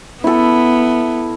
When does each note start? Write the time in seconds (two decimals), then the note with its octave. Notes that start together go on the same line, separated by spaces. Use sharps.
0.24 B3 E4 A4